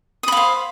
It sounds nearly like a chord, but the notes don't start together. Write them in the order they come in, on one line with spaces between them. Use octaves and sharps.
D#6 B5 F5 C5